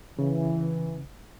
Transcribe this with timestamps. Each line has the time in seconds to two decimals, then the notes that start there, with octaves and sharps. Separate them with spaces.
0.19 C#3 E3